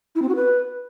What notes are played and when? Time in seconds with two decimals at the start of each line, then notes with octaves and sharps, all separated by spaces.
0.15 E4
0.22 C4
0.29 F#4
0.35 B4